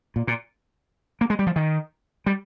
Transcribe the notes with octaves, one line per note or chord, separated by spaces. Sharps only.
A#2
A#2
A#3
G#3
G3
F3
D#3
G3